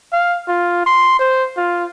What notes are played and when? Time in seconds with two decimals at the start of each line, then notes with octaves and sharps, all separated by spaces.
0.13 F5
0.48 F4
0.86 C6
1.20 C5
1.57 F4